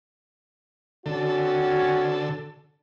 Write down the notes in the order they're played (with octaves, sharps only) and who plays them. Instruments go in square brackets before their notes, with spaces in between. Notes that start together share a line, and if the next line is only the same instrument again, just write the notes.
[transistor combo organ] D3 A4 [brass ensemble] C4 C#4 F#4